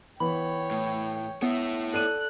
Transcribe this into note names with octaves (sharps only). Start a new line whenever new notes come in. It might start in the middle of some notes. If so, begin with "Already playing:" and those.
E3 B3 C#5 G5 B5
A2
B3 E4 C#5 E5
A4 D5 F#6 D#7